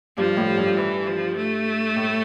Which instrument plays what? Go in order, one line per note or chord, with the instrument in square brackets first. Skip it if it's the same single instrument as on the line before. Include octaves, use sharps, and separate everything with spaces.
[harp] G2 [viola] F3
[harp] A2
G2
[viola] E3
F3
A3
[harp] A2